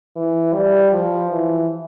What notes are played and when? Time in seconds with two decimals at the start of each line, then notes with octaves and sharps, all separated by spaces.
0.16 E3
0.55 G3
0.92 F3
1.32 E3